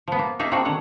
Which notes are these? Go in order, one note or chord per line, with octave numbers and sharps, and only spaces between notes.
F3 B3
A#3
A#3 D#4 G#4 E5
A#3 C4 D4 D#4 F#4 G#4
D3 D#3 C#5 F#5